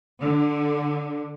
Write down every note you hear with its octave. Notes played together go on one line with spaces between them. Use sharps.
D3